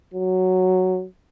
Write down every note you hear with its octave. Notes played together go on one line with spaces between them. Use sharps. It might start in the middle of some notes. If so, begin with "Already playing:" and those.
F#3